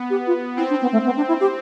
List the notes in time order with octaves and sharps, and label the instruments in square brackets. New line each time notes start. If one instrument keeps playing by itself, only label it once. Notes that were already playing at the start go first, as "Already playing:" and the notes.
Already playing: [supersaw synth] B3
[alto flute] G4
F4
[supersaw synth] C4 [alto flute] E4
[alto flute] D4
B3
A3
B3
D4
E4
G4